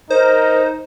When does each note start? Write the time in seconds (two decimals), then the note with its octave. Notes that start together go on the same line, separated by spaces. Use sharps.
0.10 D#4 A#4 C5